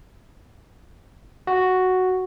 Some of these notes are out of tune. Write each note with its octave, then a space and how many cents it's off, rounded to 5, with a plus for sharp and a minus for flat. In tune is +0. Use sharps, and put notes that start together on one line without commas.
F#4 +0